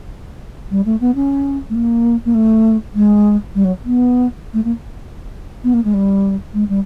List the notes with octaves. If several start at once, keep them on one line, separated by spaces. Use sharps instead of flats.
G3
A3
B3
C#4
A3
A#3
A#3
A3
G#3
G3
F#3
B3
A3
A#3
B3
A#3
G#3
G3
G#3
G3